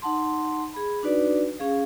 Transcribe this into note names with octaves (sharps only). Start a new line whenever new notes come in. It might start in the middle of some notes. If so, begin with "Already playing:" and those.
D#4 F#5 A5 C6
G#4 B5
D4 D#4 F#4 B4 D5
C#4 G#4 F5